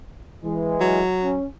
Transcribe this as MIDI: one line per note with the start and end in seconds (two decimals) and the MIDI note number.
0.44 1.00 52
0.44 1.00 56
0.80 1.36 54
1.22 1.45 61